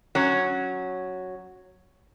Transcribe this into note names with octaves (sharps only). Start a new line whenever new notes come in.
F#3 C#4